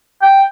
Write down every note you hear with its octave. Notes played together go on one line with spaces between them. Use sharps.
G5